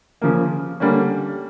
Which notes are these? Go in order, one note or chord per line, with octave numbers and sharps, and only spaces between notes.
C#3 F3 A#3
D3 G3 A#3 C#4